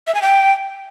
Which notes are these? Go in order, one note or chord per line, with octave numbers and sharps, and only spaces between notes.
E5
G#5
G5